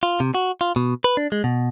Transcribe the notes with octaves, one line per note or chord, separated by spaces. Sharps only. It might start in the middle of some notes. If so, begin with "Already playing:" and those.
F4
C3
F#4
F4
B2
B4
D4
G#3
B2